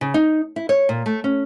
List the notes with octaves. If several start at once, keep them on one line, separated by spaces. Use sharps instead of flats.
C#3
D#4
E4
C#5
A#2
A3
C#4